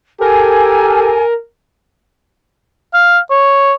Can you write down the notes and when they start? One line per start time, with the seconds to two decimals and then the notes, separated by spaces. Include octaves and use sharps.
0.21 G4 A4 A#4 G#5
2.94 F5
3.30 C#5